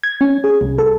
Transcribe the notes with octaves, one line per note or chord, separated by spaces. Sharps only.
G#6
C#4
G#4
C2
A4